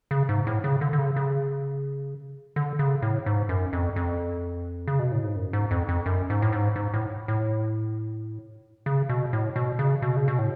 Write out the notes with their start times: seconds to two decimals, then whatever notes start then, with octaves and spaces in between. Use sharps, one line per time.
0.11 C#3
0.29 G#2
0.47 A2
0.64 C#3
0.81 D3
0.93 D3
0.99 C#3
1.16 C#3
2.56 D3
2.79 C#3
3.02 A2
3.26 G#2
3.49 F#2
3.73 F2
3.96 F2
4.87 C#3
4.99 B2
5.12 A2
5.24 G#2
5.36 F#2
5.53 G#2
5.71 F2
5.89 F2
6.06 F#2
6.30 G#2
6.42 A2
6.53 G#2
6.76 G#2
6.94 A2
7.28 A2
8.86 C#3
9.09 B2
9.33 A2
9.56 B2
9.79 C#3
10.02 B2
10.17 C#3
10.28 B2
10.39 A2